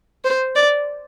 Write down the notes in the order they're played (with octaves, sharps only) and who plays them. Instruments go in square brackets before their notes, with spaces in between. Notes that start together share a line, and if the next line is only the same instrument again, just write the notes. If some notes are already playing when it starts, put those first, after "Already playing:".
[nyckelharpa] C5
D5